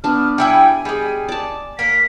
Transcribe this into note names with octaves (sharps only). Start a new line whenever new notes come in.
B3 D4 F6
G3 E4 G5 G#5
G3 G#3
D5 A5
A#3 A#4 B6